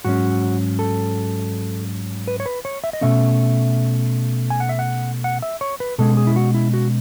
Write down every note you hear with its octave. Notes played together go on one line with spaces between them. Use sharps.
G#2 F#3 C#4 F#4
A4
B4
C#5
B4
C#5
E5
D#5
B2 A3 C#4 E5
G#5
F#5
E5
F#5
F#5
E5
C#5
B4
B2 G#3 C#4 A4
G#4
E4
F#4
E4
F#4